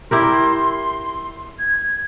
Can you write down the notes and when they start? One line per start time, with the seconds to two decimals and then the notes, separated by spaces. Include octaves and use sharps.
0.11 E4 G4 A#4 C6
1.59 G#6